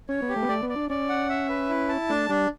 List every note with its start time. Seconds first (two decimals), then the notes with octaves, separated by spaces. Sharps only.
0.09 C#4 C#5
0.22 B3
0.29 G4
0.36 A3
0.42 B3
0.49 A3 D5
0.63 B3
0.69 D5
0.76 D4
0.89 C#4 D5
1.09 F#5
1.30 E5
1.49 B4
1.69 E4
1.89 A5
2.09 A3 D4
2.29 G3 D4